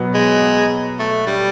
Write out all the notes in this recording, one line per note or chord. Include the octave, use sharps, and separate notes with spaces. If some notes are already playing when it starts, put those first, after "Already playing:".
Already playing: B2 F#3 B3
G#3
A3
G3